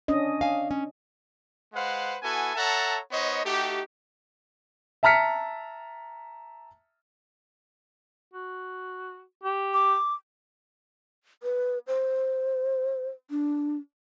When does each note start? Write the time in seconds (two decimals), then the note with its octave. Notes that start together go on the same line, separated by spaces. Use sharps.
0.08 C#4 D4 D#5
0.41 F5 G#5
0.71 C#4
1.74 G#3 B4 C5 F5 F#5
2.22 B3 E4 F#4 A4 G#5
2.55 A4 C#5 E5 F#5 A5 A#5
3.11 B3 D#4 C5 C#5 D#5
3.44 A3 D#4 F#4 G4
5.03 E5 A5 A#5 F6 B6 C#7
8.33 F#4
9.44 G4
9.74 D6
11.43 B4
11.87 C5
13.30 D4